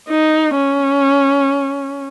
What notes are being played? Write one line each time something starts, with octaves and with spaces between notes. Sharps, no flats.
D#4
C#4